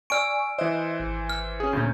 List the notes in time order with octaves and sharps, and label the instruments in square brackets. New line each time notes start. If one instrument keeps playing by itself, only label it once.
[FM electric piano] D5 G#5 C#6 [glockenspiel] E6 F6 D7
[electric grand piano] E3 C5 [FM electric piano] D#5 E5 F#6
[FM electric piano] G#1
[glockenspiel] F6
[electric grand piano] C#4 G#4
[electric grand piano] D2 C#4 [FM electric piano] A#2 G6